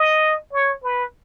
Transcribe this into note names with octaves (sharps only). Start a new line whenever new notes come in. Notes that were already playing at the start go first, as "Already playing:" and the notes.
Already playing: D#5
C#5
B4